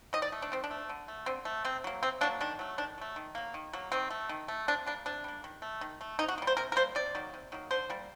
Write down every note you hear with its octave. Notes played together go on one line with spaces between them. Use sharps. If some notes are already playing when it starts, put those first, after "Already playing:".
D#3 D#5
D5
A3
D4
D#3 C4
D4
A3
D3
A3
D3 C4
A3
C3 C4
F#3 A#3
C3 C4
F#3 A#3 D4
D#3 D4
F#3 A3
D#3 D4
F#3 A3
D#3
F#3 A#3
D#3
F#3 A#3
D#3 C4
A3
D#3
A3
C3 D4
G3 A#3 D4
C3 D4
G3 A#3
D#3
A3
D#3
A3
C3 D#4
F#4
G3 A#3
C5
C3 A#4
A#4
G3 A#3 C5
C3 D5
D#3 F#3 A#3
C3
D#3 F#3 A#3
D3 C5
G3 A#3